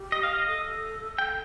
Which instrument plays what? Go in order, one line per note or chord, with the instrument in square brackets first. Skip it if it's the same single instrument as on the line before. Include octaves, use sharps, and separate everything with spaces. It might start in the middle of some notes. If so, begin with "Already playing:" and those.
Already playing: [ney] G4
[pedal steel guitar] D#5
F5
D#5
[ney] A4
[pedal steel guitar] G5